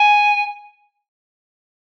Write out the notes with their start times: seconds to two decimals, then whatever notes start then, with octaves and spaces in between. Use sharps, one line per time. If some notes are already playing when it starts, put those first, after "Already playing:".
Already playing: G#5